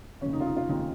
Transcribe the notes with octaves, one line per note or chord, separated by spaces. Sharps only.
F1 D#2 C#3 C#4
D#4
F4
D#4
F4
F1 D#2 C#3 D#4